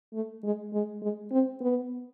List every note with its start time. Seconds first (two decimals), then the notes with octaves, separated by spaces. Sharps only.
0.13 A3
0.44 G#3
0.73 G#3
1.02 G#3
1.32 C4
1.61 B3